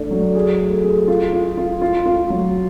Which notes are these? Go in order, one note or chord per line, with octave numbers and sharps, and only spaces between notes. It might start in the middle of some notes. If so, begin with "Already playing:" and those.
Already playing: A3 D4
F#3
G#4
A3
G#4
F4
F4
F4
F4
F4
F#3